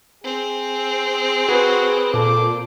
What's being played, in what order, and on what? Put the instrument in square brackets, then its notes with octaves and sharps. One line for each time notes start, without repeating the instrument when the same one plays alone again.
[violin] C4 [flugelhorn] G#4
[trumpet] F#4 [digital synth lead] G#4 [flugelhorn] B4
[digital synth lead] A#2 [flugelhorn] A4 [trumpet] D6